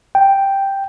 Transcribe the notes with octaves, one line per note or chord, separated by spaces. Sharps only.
G5